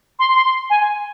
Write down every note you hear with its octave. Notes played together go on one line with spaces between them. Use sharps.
C6
C6
G#5